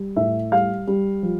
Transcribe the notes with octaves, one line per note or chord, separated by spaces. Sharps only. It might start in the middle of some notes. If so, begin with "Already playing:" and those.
Already playing: G3
A2 E5
G3 F5
G3
F3